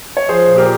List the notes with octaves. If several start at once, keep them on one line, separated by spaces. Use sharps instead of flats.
C#5
F3 G#4 C5
A#2
G4 A#4